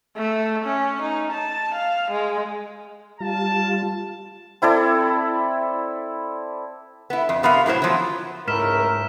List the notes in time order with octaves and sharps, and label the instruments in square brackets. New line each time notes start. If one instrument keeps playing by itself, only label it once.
[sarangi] A3
C#4
D#4
A5
F5
G#3
[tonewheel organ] G3 F4 [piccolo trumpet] A5
[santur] C4 E4 A4 D5
[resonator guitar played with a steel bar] B3 E4
F2
C3 B3 A#4 F5
A2 F#3 E4 C5
F3 F#3
[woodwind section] C#2 A3 E4 [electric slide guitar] G#2 [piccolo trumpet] A#4 [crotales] F6 B6 E7